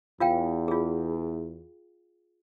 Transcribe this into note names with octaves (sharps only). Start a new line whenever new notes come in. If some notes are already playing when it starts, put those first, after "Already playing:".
E2 F4 F5 G5
F4 G#4